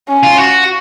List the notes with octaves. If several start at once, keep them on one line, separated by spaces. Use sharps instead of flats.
C#4
F4
F#4